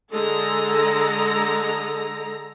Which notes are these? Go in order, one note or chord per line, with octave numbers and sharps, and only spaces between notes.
D3 G#3 A4 A#5